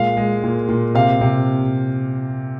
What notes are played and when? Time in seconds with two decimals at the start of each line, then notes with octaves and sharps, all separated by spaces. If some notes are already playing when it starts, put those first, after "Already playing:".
Already playing: A#2 G#3 F5
0.17 G#3
0.43 A#2
0.69 A#2
0.94 C3 F5
1.21 C3